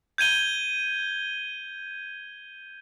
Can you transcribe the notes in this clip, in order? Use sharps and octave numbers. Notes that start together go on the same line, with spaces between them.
G6 G#6 D#7 G7